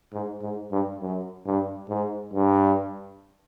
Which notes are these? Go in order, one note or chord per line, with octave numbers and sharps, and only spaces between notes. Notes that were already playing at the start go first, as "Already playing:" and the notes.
G#2
G#2
G2
F#2
G2
G#2
G2